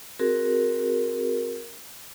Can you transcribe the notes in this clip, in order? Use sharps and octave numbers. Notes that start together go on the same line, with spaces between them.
C4 F#4 G#4 A#4